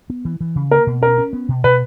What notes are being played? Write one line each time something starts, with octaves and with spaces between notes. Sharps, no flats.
B3
E3
E3
C#3
A#3 A#4
B2
C#4 A#4
C#4
B3
B2
B2 B4